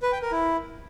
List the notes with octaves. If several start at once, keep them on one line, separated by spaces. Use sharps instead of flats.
B4
G5
A#4
E4